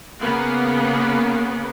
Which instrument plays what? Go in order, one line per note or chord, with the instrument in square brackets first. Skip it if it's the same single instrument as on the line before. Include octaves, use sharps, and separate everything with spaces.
[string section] C#3 A#3 B3